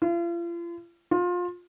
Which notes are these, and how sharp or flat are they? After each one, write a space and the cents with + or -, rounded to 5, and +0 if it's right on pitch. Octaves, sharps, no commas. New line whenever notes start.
F4 -40
F4 +25